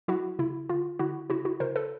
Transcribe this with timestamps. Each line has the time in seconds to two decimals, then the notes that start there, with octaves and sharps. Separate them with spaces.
0.08 F#3 E4 F#4
0.39 C#3 E4
0.69 D3 F4
0.99 D3 E4 F#4
1.30 C#3 E4 F#4
1.45 E4 F#4
1.60 C#3 A#4 C5
1.76 A4 B4